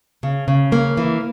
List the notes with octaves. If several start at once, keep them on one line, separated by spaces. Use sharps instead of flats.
C#3
C#3
A#3
E3